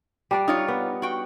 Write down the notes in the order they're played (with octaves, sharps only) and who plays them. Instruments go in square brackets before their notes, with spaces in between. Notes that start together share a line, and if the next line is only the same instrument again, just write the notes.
[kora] G3 D4 D5
[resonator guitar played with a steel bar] D#4 F4 C#5
[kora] B3
[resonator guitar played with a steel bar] F#4 G5